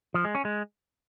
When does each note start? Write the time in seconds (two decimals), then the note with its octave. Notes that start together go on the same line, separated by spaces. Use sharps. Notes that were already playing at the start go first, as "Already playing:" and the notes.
0.14 F3
0.25 G#3
0.35 C#4
0.45 G#3